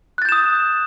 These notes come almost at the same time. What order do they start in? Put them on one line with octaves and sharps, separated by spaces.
F#6 A6 G6 E7 D#6